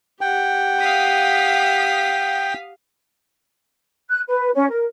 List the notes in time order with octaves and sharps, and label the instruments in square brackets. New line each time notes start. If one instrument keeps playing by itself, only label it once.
[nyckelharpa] G4 F#5 [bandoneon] G5
[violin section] F5 D#6 B6
[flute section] F#6
B4
C#4
A#4